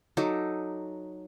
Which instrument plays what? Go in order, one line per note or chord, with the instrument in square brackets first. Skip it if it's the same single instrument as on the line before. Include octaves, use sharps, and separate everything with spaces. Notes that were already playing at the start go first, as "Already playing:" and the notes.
[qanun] F#3 D#4 A4 D6